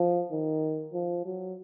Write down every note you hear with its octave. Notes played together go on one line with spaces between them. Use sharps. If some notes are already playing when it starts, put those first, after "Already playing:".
Already playing: F3
D#3
F3
F#3